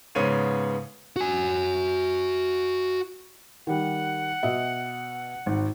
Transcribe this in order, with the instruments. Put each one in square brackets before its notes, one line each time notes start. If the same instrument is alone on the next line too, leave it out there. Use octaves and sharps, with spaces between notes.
[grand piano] G#2 C#3 B3 C#5 D#7
[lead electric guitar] F#4 G#5
[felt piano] D#3 G3 [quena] F#5
[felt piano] B2 D#5 E5
G#1